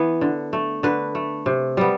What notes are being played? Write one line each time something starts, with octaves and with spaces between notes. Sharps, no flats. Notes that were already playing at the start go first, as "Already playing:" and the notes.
Already playing: E3 B3
D3
A3
D3 B4
A3
C3
G3 B3